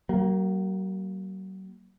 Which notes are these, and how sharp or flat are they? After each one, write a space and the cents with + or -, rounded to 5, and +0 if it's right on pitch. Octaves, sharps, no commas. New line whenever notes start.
F#3 +45 A#3 +0